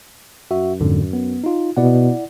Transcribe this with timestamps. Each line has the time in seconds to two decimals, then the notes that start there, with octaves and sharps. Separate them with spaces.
0.51 F#2 F#4 E5
0.81 F2 G#2 D3
1.13 B3
1.44 D#4 F4
1.77 B2 E4 D5 F#5